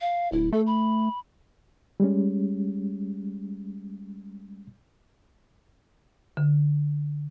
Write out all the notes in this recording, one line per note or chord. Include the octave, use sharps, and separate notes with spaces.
F5
D1 E4
A3 A4
B5
G3 G#3 C#4
D3